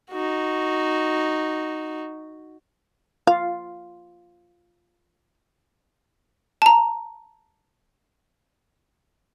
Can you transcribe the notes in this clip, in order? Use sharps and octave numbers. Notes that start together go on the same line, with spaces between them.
D#4 F#4
F4 F5
A5 A#5